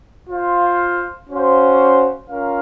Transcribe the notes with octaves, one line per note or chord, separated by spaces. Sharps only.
F4 C5 F5
C#4 F#4 C5 F5
C#4 F4 A#4 F5